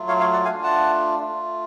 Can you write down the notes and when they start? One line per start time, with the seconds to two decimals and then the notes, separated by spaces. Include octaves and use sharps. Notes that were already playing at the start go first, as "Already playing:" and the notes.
Already playing: F#3 A3 F4
0.08 C#5 F5
0.20 C#5 F5
0.33 D5 F#5
0.45 A3 D4 F4 F5 G#5
0.63 F#5 A5
1.19 A3 F4